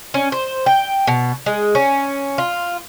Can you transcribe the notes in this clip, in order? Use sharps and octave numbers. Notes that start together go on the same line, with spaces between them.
C#4
C5
G5
B2
G#3
C#4
F4